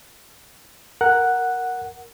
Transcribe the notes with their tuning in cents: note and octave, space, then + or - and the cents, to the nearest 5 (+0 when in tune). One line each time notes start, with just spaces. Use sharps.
A#4 +0 F#5 +0